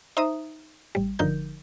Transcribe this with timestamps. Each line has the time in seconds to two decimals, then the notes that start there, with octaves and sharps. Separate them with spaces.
0.17 D#4 C5 E5 A#5 D#6
0.95 A1 G3
1.19 G1 D3 F3 D#4 A#4 G6